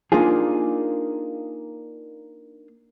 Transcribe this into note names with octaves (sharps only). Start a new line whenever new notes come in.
A#3 D4 D#4 F4 G#4